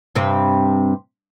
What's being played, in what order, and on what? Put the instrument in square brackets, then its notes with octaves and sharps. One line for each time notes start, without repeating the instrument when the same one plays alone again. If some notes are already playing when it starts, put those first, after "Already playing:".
[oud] G2 C3 C4